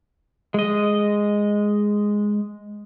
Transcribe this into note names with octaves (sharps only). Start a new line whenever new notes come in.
G#3 D#5